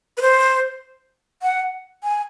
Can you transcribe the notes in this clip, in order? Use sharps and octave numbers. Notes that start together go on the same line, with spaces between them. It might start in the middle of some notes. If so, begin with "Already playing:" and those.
B4
C5
F#5
G#5